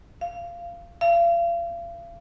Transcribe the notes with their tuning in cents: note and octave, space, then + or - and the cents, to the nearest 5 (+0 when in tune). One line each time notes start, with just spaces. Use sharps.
F5 -20
F5 -40